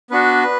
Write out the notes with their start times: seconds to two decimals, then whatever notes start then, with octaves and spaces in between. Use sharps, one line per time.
0.11 B3 D4 F#4 B4